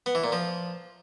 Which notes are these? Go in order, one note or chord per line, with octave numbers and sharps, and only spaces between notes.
B3
E3
A#2
F3